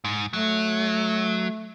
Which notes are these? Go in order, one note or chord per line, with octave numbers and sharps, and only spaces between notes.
G#2
F#3 A3